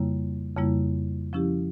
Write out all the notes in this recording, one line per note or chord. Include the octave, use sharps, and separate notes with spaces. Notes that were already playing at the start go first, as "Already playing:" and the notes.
Already playing: F2 C#3 G3 A#3 E4
F2 C#3 G3 A#3 E4
F3 C#4 E4 G4